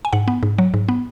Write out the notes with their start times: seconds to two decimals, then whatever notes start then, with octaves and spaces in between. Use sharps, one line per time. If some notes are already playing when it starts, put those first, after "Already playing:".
0.05 G#5
0.13 G#2 F#5
0.28 B3
0.43 G#2
0.58 F#3
0.74 G#2
0.89 B3